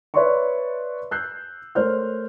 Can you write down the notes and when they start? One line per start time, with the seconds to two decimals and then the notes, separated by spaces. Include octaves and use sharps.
0.14 B4 C#5 D5 E5 C6 C#6
1.11 E6 F#6 G6 C7
1.75 A3 A#4 C5 C#5 F6 G6